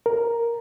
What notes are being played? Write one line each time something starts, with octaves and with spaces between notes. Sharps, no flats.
A#4